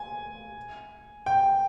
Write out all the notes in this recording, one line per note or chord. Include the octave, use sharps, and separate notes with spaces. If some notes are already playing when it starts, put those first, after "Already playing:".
Already playing: G#5
G5